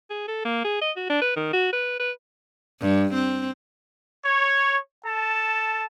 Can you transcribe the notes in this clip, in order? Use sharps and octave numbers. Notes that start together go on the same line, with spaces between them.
G#4
A4
A#3
G#4
D#5
F#4
D4
B4
D#3
F#4
B4
B4
G2
C4
C#5
A4 A5